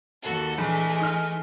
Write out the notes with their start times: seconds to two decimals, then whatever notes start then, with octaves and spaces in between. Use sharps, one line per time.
0.22 D#2 F#4 A4
0.58 A#1 E3 G#3 A3
1.00 D#4 F6